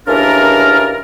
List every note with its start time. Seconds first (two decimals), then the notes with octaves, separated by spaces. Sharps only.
0.07 D#2 C#3 E3 D4 F4 A#4